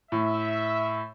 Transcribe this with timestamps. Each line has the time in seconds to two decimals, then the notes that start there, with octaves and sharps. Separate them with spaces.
0.12 A2 E5